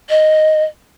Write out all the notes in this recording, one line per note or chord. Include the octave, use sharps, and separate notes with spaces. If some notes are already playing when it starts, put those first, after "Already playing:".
D#5